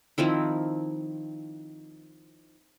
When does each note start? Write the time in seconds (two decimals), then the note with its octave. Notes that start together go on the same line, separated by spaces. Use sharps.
0.18 D#3 F3 C4 E4